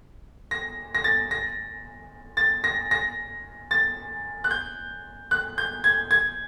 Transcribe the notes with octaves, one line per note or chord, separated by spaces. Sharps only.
A#6
A#6
A6
A#6
A6
A#6
A#6
A6
F#6
G6
F#6
G6
G#6
G#6